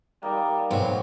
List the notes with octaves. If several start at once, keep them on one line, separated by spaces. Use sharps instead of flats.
G3 A#3 D#4 A#4
B1 G#2 F#3